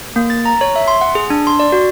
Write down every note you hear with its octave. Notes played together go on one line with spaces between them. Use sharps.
A#3
A6
A#5
C#5
E5
C6
F#5
G#4
D4
C6
D5
F#4